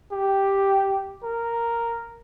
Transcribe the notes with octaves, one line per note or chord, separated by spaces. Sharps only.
G4
A#4